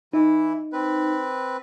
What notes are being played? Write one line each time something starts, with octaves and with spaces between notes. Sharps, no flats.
E3 D#4 E4
C4 B4